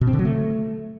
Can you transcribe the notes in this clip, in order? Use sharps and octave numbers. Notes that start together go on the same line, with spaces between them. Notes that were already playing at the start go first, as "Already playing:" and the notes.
B2
C4
D3
F#3
A3